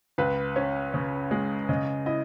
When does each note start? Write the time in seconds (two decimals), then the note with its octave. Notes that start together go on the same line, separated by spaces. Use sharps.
0.18 C#2 B4
0.56 C#4
0.94 C#3
1.31 G#3
1.69 C#3 D#5
2.06 E4 D#5